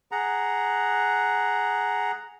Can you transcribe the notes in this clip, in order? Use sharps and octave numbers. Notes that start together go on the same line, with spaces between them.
G#4 F#5 A#5